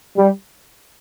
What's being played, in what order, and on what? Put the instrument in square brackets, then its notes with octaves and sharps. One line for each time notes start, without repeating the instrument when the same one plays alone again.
[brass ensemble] G3